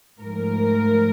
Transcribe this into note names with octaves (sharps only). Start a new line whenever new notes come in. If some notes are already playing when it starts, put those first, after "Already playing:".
G#2 F3 A3 A#4